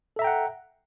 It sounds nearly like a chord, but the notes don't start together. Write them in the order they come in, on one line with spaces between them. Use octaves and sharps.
A4 E5 A#5 G5 F#5